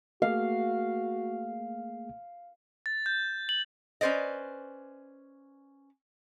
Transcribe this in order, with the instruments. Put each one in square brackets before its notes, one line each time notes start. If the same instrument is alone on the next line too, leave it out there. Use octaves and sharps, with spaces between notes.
[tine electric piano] A3 A#3 G#4 [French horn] F#4 [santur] F5
[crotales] A6
G6
F#7
[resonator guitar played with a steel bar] C#4 B4 C5 D5 D#5